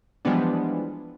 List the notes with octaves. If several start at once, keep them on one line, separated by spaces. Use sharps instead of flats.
E3 F3 G3 G#3 B3 D4